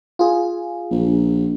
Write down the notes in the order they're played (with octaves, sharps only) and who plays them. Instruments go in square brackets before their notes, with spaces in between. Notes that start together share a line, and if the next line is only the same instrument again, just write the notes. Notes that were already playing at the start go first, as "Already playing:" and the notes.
[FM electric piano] F4 G#4
[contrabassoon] A#1